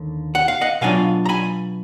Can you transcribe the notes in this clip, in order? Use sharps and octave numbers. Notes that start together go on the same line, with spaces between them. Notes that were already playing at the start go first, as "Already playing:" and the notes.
Already playing: D#2 D3
F#5
F5
D#5 F#5
B2 F#3 D4 F4 F5 G#5
A#5
G#5 B5